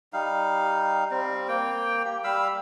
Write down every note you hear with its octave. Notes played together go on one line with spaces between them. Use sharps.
G3 D#4 F5
G3 C4
A#3 G5
G4
G3 F5 B5 E6